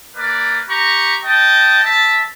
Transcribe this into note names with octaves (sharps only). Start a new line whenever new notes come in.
A#3 B4 D5
G4 A#5 C#6
D#5 G5 A5
E5 A5